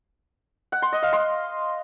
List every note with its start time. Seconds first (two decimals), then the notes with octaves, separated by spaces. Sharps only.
0.72 F#5
0.82 C6
0.92 D#5
1.03 F5
1.13 C6